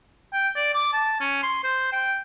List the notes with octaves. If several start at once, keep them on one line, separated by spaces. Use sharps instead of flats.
G5
D5
D6
A5
C#4
C6
C5
G5